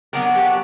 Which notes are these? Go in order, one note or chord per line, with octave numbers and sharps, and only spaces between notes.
F#3 B3 D4 A#4
G4